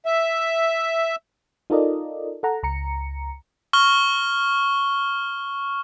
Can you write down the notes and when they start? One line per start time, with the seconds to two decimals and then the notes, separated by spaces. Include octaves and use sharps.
0.06 E5
1.70 D#4 F4 A4 A#4 D5 D#5
2.43 A4 F#5 A#5
2.63 C#2 A#5 C#7
3.73 C#6 F6 G7